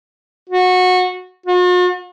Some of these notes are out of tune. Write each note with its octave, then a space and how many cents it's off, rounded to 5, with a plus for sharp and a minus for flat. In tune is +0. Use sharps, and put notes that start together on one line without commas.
F#4 -20
F#4 -45